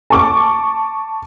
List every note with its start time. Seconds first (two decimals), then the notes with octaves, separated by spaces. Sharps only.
0.10 A5 C#6 D6